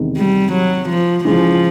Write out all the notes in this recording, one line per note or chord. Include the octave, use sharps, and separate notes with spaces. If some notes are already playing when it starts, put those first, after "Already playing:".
Already playing: E2 C3 D#3 G#3
G3
F#3
F3
C#3 E3 F3 G#3